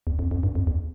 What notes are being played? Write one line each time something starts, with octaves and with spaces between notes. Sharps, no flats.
E2
F2
F2
G2
F2
E2